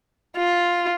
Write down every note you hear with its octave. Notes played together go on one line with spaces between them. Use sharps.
F4